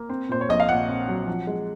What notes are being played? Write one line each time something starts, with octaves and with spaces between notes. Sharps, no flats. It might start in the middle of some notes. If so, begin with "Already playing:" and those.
Already playing: A#3
C4
A#2 C5
C#5
A#1 D#5
F5
A#2 F#5
C4
F#3
F3
G#3